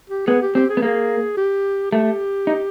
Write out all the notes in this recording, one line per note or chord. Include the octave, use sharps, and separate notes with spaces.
G4
B3 G#4
G4
C4 G4
G#4
B3
A#3 G#4
G4
A3 G4
D#4